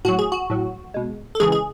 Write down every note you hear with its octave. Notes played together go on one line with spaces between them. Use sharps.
A2 F#3 F#4
G#4
F#4
A2 F#3
B2 G#3
A4
C#3 E3 G#3 G#4
G#4